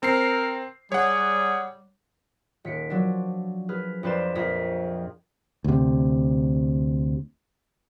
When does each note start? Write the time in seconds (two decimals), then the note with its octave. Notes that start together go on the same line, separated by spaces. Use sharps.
0.03 C4 A#4 C7
0.92 G3 G#4 C#5 F#5
2.65 D#1 B6 C#7 D7
2.90 F3 F#3 D4
3.69 G#4 B4 F6
4.03 F2 D4 B4 C5 D5 E7
4.35 A#1 F2 G#4 A#5 A#6 B6
5.64 D2 C3